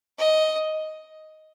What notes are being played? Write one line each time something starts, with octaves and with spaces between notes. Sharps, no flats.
D#5